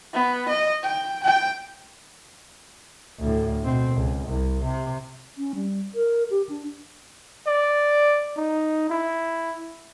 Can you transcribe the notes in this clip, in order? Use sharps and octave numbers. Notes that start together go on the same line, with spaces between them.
B3
D#5
G5
G5
D2 A2
B2 C4
C#2
C2
C3
C#4
G3
A#4
G4
D4
D5
D#4
E4